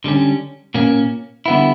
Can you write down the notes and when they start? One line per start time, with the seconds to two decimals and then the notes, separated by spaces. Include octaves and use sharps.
0.04 D3 G3 C#4
0.74 A#2 A#3 C#4
1.46 D3 G3 B3 E4